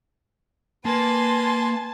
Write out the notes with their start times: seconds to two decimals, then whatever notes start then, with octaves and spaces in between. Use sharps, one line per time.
0.85 A#3 B4 G#5 A5 C6